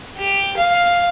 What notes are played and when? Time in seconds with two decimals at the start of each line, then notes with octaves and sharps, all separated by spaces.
0.18 G4
0.57 F5